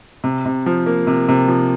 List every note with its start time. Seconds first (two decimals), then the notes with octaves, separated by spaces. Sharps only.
0.24 C3
0.46 C3
0.66 F3
0.86 A#3
1.07 C3
1.29 C3
1.48 F3